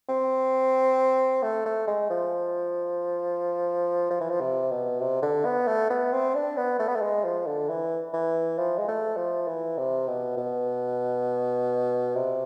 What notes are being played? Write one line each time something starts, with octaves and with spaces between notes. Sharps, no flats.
C4
A3
A3
G#3
F3
F3
E3
F3
C3
B2
C3
D3
B3
A3
B3
C4
D4
B3
A3
B3
A3
G#3
F3
D3
E3
E3
F3
G#3
A3
F3
E3
C3
B2
B2
C3